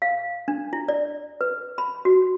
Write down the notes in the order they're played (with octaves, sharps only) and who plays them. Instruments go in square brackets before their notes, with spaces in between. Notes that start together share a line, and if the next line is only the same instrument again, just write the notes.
[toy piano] F5
D4
E4
D5
B4
B5
F#4